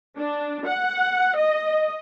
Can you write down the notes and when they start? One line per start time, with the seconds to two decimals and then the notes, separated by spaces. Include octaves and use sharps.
0.18 D4
0.67 F#5
1.37 D#5